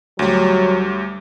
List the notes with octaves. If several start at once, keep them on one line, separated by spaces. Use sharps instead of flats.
D2 F#3 G3